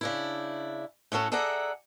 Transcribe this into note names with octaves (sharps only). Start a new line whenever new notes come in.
C#3 D4 E4
A2 C#4 F#4 A4
G#4 A4 D5 E5 F#5 A#5